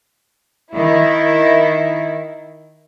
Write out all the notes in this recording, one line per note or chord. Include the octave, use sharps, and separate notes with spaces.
D#3 E4